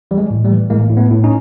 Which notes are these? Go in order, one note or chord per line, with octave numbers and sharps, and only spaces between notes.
E3 G3
G#3
A2
G3 A3
E3
A2 G#3 A#3
A2
A3 B3
A2
C#4 D#4